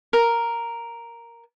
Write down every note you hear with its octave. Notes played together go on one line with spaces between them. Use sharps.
A#4